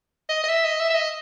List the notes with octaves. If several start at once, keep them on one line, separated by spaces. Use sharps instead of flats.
D#5
D#5
E5
D#5
E5
E5
D#5